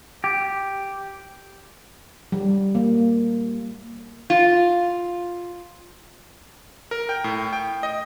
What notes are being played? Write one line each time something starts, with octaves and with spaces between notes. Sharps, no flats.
G4
G3
A#3
F4
A#4
G5
A2
G5
D#5